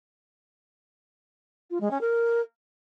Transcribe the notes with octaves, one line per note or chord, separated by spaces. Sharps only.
F4
G#3
C#4
A#4